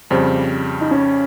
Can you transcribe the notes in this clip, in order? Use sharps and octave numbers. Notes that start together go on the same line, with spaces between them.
F2 C#3 G3 C4
D#4
C#4